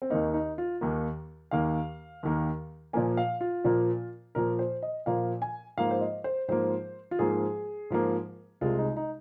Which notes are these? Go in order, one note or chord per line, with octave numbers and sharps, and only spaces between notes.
C4
D#2 D#3 A#3 D#4
D#4
F4
D#2 D#3 A#3
D#2 D#3 A#3 F5
D#2 D#3 A#3
A#2 F3 A#3 G#5
F5
F4
A#2 F3 A#3
A#2 F3 A#3 A#4
C5
D#5
A#2 F3 A#3 F5
G#5
G#2 F3 A#3 F5
C5
D#5
C5
G#2 F3 A#3 C5
F4
G#2 F3 A#3 G#4
G#2 F3 A#3
C2 C3 G#3 F4
D#4
D#4